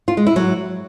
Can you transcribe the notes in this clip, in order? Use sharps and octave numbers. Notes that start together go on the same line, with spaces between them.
F4
G#3
E4
F#3